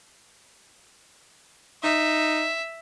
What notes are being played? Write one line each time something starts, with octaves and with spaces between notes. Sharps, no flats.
D#4 E5